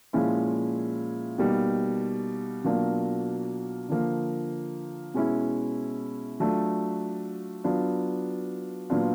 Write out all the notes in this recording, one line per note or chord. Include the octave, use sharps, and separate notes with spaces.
A#2 F3 G#3 C#4 E4
B2 G3 A#3 D#4
B2 F#3 A#3 D4 F4
D3 F3 A#3
B2 G#3 C#4 E4
F#3 A3 D4 F4
F#3 B3 D4 F4
A#2 F#3 B3 D4 F4